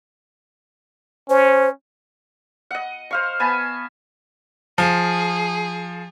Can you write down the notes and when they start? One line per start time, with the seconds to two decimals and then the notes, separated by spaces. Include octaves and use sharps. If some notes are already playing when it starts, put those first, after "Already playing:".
1.30 C#4 C5
2.71 D#5 F#5
3.11 C5 F5 C#6
3.40 B3 G#5 A5 B5
4.78 F3 G#4